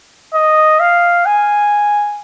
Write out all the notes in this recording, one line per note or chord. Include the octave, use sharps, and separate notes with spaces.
D#5
F5
G#5